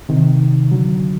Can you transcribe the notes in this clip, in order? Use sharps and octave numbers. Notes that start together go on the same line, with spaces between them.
C3 D#3
D3 F#3